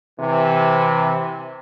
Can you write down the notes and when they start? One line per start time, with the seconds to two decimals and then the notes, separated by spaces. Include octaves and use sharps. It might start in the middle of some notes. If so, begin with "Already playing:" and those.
0.20 C3 E3